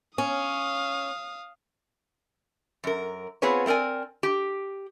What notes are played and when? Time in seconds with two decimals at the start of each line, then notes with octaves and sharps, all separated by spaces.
0.18 C#4 F5 D#6
2.84 F#2 A#4
3.42 B3 C4 F4 G#4 B4 C#5
3.66 A3 C4 A#4 D5 G#5
4.23 G4